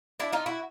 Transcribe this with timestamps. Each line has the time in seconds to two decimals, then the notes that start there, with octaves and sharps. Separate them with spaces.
0.20 D4 E4
0.32 D#4 F4
0.46 E4 F#4